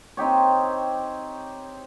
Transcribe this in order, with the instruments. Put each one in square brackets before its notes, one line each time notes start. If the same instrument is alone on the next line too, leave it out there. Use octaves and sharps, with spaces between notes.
[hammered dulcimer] C4 D#4 G4 C#5